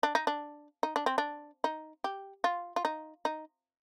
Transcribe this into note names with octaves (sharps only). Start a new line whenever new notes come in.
D4
D#4
D4
D#4
D4
C4
D4
D#4
G4
F4
F4
D#4
D#4